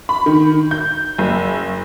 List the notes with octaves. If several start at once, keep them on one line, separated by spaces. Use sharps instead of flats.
B5
D#3
G6
F#1